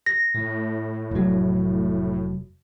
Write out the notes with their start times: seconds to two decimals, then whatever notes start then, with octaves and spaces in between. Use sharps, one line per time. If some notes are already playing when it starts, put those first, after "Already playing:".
0.06 A#6
0.34 A2
1.11 F1 F#3